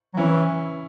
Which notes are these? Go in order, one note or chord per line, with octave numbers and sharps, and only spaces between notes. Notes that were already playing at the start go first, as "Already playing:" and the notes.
F#3
E3 C#4 E4